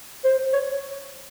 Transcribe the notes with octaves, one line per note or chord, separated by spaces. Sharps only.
C5
C#5